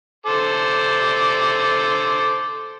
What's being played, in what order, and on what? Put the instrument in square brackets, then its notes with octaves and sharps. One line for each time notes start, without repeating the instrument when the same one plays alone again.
[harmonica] A4 C5 D6